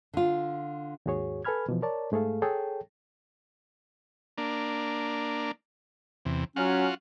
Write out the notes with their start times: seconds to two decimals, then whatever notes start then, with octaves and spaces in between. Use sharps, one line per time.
0.13 D3 F4
1.06 D#2 G#2 F#4 G#4 C#5
1.45 A4 B4 G#5 B5 F6 G#6
1.69 B2 E3 F3
1.82 A#4 C#5 D5 A5
2.12 G#2 A3 G#4 A4 F5
2.42 G#4 A4 C#5 G5 A5
4.38 A#3 D4
6.25 E2 C3
6.56 F#3 C#4 F4 F#4